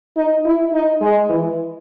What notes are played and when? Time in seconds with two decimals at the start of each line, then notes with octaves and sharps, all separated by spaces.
0.16 D#4
0.45 E4
0.73 D#4
1.01 G#3
1.30 E3